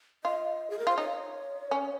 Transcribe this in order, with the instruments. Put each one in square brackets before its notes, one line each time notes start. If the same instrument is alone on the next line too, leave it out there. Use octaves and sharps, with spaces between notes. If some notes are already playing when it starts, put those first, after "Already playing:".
[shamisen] F4 [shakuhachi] D#5
[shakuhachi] G#4
A#4
[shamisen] F4 [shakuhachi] C5
[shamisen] D#4 [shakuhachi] C#5
[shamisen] C#4